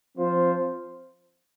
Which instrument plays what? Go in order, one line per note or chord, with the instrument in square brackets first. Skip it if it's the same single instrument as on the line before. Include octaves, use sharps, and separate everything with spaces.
[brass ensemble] F3 C4 F4 C5